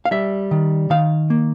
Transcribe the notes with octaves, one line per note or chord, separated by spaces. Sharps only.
F5
G3 E5
D#3
D#3 F5
A#3